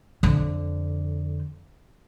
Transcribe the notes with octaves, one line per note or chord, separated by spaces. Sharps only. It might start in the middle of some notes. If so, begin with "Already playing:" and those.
F2 D3